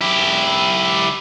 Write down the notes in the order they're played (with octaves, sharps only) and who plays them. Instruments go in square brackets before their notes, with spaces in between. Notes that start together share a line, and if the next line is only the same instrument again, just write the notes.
[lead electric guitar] E4 G4